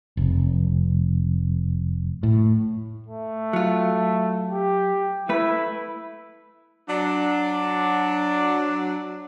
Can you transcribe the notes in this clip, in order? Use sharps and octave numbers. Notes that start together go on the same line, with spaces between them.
F1
A2
A3
F#3 F4
G4
A3 E4 B4
F#3 D4